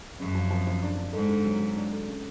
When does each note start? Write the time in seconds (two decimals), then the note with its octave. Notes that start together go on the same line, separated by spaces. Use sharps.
0.20 F#2 C#3
0.35 F3
0.50 F3
0.67 F3
0.82 D4
0.98 D4
1.13 G#2 A3
1.29 D3
1.45 F#3
1.60 F#3
1.77 D4
1.92 A3
2.08 C#3